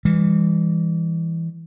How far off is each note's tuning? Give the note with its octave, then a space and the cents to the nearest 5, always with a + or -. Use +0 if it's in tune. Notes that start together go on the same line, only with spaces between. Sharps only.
E3 +5 G3 +40